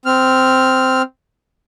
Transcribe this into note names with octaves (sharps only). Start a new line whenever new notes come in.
C4 F6